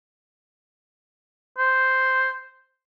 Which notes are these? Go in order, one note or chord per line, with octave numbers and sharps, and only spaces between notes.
C5